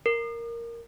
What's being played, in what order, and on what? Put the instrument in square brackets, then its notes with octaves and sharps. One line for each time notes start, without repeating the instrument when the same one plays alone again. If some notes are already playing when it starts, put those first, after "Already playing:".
[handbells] A#4